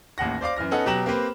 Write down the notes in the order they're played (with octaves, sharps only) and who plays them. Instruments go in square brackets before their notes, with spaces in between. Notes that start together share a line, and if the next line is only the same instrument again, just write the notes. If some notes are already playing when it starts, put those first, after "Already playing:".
[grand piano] A1 D#2 F#5 A#6
C5 D5 F5 D6
F#2 E3 F6 A#6
B3 C#4 D#4 A4 F#5
B2 F#3 G4 A#5 E7 F#7
A#3 C4 G4 B4 C5